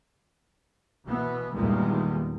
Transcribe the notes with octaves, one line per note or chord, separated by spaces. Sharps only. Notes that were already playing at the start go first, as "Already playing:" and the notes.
B2 E3 B3
E2 A#2 D#3 G3 G#3